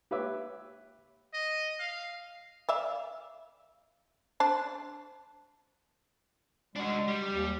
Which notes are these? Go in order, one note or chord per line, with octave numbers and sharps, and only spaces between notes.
G4 B4 C#5 E5 D6
D#5
F5
D5 E5 F5
D4 C5 A5
G#3 D4 F#4
G3
D#2